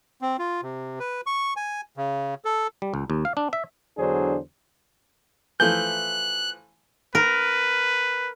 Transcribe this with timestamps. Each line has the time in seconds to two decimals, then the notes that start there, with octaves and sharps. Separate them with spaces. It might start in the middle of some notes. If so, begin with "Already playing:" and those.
0.21 C4
0.39 F4
0.63 C3
0.99 B4
1.26 C#6
1.56 G#5
1.97 C#3
2.45 A4
2.82 G3
2.94 C#2
3.10 D#2
3.25 F5
3.37 D4
3.53 E5
3.97 E2 D3 F#3 D4 G#4 C5
5.60 E3 F3 A3 F#6 G6
7.15 A#4 B4